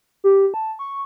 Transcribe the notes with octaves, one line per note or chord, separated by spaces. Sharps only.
G4
A5
C#6